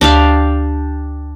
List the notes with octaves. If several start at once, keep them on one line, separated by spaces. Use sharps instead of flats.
D2 D4 G4 F5